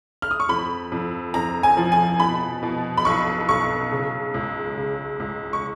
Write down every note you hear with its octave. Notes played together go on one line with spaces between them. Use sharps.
F6
D#6
C#6
F2 B5
F2
F2 A#5
G#5
F3
G#5
B2 B5
B2
B5
B1 C#6
B1 C#6
C#3
C#2
C#3
C#2
C#6